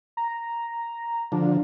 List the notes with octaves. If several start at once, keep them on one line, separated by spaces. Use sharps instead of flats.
A#5
D3 F3 D4